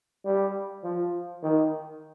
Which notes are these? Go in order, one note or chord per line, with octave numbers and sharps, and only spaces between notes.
G3
F3
D#3